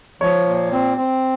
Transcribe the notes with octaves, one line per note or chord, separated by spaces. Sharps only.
F3 C#5
A#2
C4
C4